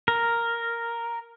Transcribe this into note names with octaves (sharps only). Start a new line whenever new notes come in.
A#4